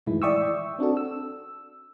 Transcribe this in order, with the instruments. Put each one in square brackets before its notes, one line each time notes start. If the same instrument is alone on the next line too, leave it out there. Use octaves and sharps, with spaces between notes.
[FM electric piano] F#2 A2 D#3 E3 G#3 E4
D5 E5 G5 C#6 D#6 E6
C4 D4 F#4 A4
E6